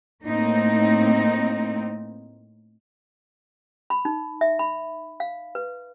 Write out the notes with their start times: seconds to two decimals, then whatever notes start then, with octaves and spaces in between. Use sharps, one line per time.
0.24 A2 A#3 C4 D#4
3.90 B5
4.05 D#4
4.41 E5
4.59 B5
5.20 F5
5.55 B4